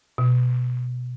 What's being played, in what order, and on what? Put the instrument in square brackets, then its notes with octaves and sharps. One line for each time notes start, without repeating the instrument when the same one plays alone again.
[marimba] B2